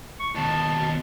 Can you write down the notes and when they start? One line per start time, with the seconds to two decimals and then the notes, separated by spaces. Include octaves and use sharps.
0.20 C#6
0.35 D#2 B2 A5